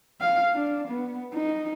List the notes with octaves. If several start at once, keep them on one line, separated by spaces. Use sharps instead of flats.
F5
D4
B3
D#4